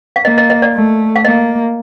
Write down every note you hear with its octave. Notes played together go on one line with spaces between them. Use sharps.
F5
A#3 D#5
D#5
D#5
D5
A3
F5
A#3 D#5